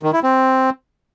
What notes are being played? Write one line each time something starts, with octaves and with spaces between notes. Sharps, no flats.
D#3
E4
C4